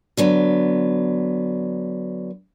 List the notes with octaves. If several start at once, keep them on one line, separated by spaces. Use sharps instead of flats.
D3 F#3 B3